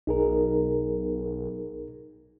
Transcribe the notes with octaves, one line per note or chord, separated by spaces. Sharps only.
B1 D#4 G#4 A#4